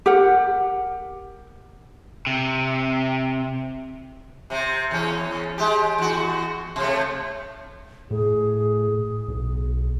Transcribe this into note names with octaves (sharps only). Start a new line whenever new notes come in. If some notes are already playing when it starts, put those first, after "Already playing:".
G4 A#4 F#5
C3
C3 C4
E2 C#4
G#3 G4
E2 F#4
C3 A3
A2 G#4
B1